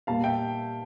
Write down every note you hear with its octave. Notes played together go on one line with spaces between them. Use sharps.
A#2 G3 A#3 F5 A5
E5 G5